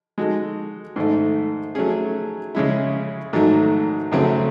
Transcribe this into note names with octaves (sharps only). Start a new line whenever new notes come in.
G#3 D#4 F#4 A4
G#2 D#3 A3
F#3 A3 C#4 G#4
C#3 G#3 C#4 E4
G#2 D#3 F#3 A3
F#2 C#3 F#3 A3 C4